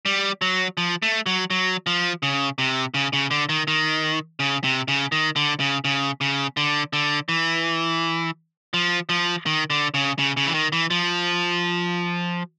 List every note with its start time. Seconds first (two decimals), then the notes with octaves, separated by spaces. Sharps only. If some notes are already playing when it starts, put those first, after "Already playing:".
0.06 G3
0.42 F#3
0.77 F3
1.02 A3
1.26 F#3
1.50 F#3
1.87 F3
2.23 C#3
2.58 C3
2.94 C#3
3.13 C#3
3.31 D3
3.49 D#3
3.68 D#3
4.40 C#3
4.64 C3
4.88 C#3
5.12 D#3
5.36 D3
5.60 C#3
5.85 C#3
6.21 C#3
6.57 D3
6.93 D3
7.29 E3
8.74 F3
9.09 F3
9.46 D#3
9.70 D3
9.94 C#3
10.19 C#3
10.37 C#3
10.46 E3
10.54 D#3
10.73 E3
10.91 F3